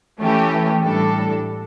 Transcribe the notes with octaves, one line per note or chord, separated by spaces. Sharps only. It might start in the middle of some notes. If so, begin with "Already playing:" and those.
E3 A3 C#4 G4
A2 G3 D4 A4